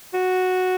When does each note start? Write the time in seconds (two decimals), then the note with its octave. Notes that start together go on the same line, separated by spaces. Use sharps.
0.14 F#4